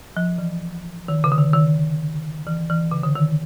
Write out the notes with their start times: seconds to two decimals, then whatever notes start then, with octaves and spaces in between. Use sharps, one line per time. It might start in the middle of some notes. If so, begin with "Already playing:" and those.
0.17 F3
0.38 E3
1.08 D#3
1.24 C#3
1.32 D3
1.38 D#3
1.53 D#3
2.47 E3
2.70 E3
2.91 C#3
3.03 D3
3.15 D#3